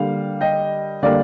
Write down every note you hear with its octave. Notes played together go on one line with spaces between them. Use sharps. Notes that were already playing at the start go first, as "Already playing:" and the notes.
Already playing: D3 G3 A#3 F5
D#5 G5
D3 G3 A#3 D5 F5